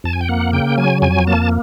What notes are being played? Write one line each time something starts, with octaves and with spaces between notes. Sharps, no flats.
F2 A5
G#5
G5
A#3 F#5
C#3 G5
F#3 G#5
F2 G#5
A#3 A5